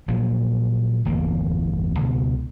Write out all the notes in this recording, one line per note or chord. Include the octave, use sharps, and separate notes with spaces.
A#2 F3 F#3
D1 G1 E2 A#3
C#2 B2